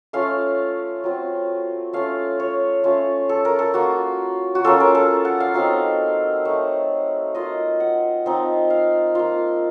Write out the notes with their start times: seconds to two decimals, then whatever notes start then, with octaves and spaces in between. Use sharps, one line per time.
0.13 A3 C#4 F4 F5
1.04 F#3 C4 F4
1.93 A3 C#4 F4 F5
2.40 C#5
2.84 A3 C#4 F4
3.29 A4
3.45 A#4
3.59 A4
3.74 A#3 F4 F#4
4.55 F#4
4.65 A#3 C#4 F4 A4
4.80 A#4
4.95 A4
5.25 F#5
5.40 F5
5.54 F#3 C4 D#4 F5
6.45 A3 D#4
7.35 A#3 F4 D#5
7.80 F#5
8.26 F3 C4 D#4
8.70 F5
9.15 A#3 F4